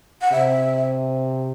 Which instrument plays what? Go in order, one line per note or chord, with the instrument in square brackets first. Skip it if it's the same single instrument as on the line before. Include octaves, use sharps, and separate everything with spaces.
[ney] F#5
[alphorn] C3 [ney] E5